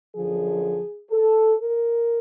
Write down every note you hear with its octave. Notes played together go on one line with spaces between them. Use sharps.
F#2 D3 F3 G#4
A4
A#4